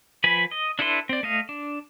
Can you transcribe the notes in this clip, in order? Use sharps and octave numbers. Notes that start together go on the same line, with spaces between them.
F3 B4 G#5 B5
D#5
D4 E4 A4 B4 C6
C4 D5
A3 D#5 F5
D4